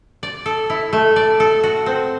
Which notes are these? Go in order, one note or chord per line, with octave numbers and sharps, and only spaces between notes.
D5
A4
E4
A3
D5
A4
F#4
C4